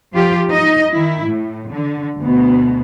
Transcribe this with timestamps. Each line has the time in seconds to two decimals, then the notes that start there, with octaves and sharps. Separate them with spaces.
0.13 F3 F4 G4
0.49 D#4 D#5
0.92 D#3 E4
1.27 A2
1.70 D3
2.17 D2 B2